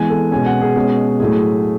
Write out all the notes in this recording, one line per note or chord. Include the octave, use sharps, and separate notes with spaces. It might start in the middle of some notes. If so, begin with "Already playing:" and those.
Already playing: E3 G#3 B3 G#5
A4
B2 G#3 C#4 G#5
F#5
G#4
B2 G#3 C#4
A2 F#3 A3 G#4